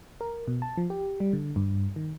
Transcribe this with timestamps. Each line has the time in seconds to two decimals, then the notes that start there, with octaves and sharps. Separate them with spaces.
0.21 A#4
0.47 B2
0.62 A5
0.77 F3
0.90 G4
1.20 G3
1.33 D3
1.56 G2
1.96 D#3